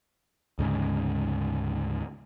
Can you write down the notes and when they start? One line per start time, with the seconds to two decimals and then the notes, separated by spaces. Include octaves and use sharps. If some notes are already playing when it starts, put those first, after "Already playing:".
0.59 D2 G#2 C#3